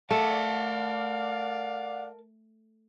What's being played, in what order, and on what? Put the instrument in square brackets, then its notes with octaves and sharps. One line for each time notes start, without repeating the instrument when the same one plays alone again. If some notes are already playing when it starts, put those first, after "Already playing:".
[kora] A3 [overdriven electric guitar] A#4 A5 [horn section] D5 F5 F#5